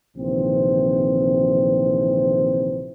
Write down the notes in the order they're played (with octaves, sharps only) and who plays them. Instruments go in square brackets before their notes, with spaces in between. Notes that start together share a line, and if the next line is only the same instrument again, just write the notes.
[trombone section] A#1 C3 D#3 E3 C4 C5